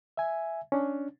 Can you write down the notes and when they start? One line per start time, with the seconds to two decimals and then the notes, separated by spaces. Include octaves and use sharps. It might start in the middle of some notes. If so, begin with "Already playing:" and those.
0.17 E5 G#5
0.72 C#4 D4